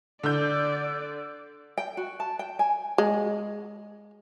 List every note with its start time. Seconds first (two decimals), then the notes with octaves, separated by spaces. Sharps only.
0.23 D3 D5 G6
1.77 G5
1.97 F#4
2.20 A5
2.39 G5
2.59 G#5
2.98 G#3